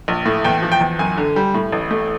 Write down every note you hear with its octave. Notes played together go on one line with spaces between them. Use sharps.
A#1
A2
E2 G5
F3
G5
E2
F#2 G#5
D3
G3
A2
A1
A3